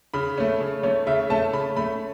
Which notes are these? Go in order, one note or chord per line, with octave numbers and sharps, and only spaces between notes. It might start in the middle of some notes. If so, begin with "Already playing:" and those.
C#3 B5
A3 C#4
C#3
A3 C#4 C#5
C#3 E5
A3 C#4 A5
C#3 B5
A3 C#4 B5